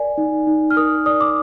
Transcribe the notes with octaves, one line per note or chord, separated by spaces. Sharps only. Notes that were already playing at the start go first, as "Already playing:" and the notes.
Already playing: A#4 D5 G#5
D#4
D#4
F6
A#4 D#6
D5 D#6
D6